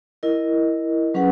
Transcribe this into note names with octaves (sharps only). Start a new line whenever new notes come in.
E4 A#4 D#5
F#3 C#4 G#4 B4 F#5